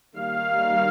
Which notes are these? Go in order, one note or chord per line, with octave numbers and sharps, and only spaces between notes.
D#3 G3 A#3 F5